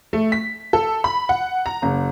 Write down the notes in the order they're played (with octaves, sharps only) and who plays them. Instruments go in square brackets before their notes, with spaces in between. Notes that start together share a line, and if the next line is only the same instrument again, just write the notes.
[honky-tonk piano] A3
B6
A4
B5
F#5
A#5
F#1